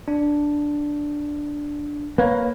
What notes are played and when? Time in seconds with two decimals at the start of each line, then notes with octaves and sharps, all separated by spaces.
0.08 D4
2.18 A#3 B4 C#5